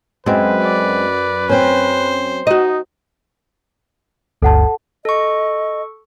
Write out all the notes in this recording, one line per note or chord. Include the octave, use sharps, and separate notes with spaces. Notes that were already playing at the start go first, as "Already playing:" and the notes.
F#2 G#3 C4 B4
D5
C4 C#4 C5
D#4 F#4 D#5
G1 D2 A4 F#5 A5
A4 D#5 C#6